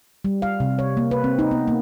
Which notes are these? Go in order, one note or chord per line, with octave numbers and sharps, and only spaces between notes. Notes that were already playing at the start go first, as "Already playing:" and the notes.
G3
F5
C3
C#5
A#3
B4
C4
D#4
B3
A#3